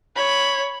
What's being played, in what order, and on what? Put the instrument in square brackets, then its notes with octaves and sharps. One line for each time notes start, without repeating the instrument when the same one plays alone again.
[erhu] C#5 [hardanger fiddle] B5